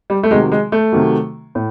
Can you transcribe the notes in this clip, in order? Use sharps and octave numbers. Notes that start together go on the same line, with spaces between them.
G3
A3
C3 D#3 F#3 G#3
G#3
A3
C3 D#3 F#3
A2